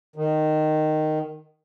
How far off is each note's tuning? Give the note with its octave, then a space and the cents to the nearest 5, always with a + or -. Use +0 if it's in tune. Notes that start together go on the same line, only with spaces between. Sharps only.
D#3 -10